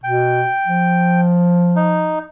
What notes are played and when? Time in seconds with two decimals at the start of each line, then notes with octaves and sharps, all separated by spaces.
0.04 B2 G5
0.67 F3
1.76 D#4